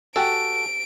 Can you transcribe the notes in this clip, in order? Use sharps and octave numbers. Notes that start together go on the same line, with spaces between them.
F#4 G4 A4 G#5 D7